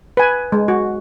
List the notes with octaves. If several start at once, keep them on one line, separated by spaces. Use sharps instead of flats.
B4 G#5
G#3
F#4